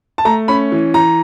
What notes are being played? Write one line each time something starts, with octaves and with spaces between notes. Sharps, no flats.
A5
A3 A#5
C#4 B5
E3
E3 A#5